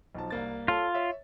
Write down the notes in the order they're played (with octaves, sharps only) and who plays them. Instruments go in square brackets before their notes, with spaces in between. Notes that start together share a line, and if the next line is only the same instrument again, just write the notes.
[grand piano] B1 F3 A5
C2 A#3 A6
[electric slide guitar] F4 [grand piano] A4 C#5 A5
[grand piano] C#5 E5